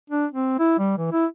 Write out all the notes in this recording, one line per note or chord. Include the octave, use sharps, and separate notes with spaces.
D4
C4
E4
G3
E3
E4